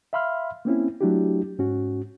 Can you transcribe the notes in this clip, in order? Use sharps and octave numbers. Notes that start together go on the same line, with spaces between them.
E5 F5 B5 C6 F6
A#3 C4 C#4 E4
F#3 A3 D4 E4 F#4 G4
G#2 C#4 F#4